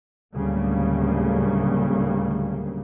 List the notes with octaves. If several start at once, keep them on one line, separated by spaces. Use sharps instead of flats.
D2 A2 C#3 F#3 G3 A#3